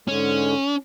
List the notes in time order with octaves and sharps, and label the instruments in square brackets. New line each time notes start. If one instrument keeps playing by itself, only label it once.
[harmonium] G#2 D3 G#3 [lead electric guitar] C#4